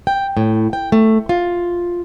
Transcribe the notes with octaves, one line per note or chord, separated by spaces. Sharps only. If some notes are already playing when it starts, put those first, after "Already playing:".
G5
A2
G5
A3
F4